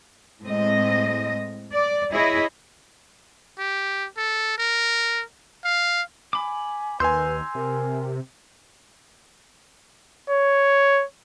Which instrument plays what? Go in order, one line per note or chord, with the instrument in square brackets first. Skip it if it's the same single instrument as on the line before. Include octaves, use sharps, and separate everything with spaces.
[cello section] A2 G#3 C4 D#5
D5
E4 G#4 C#5 D#5
[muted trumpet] G4
A4
A#4
F5
[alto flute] G#5 [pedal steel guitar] B5 D6
[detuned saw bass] D#2 [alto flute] B4 [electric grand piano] G#5 C6 [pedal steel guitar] A#5 E6 G6
[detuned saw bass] C3 [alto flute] A#4
[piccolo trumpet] C#5